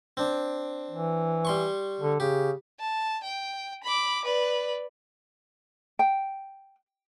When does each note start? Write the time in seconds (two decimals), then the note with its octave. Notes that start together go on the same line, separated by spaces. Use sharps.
0.17 C4 D4
0.91 E3
1.45 G3 C6 C#6
2.01 D3
2.20 C#3 G4
2.79 A5
3.23 G5
3.83 B5 D6
4.25 B4 D5
5.99 G5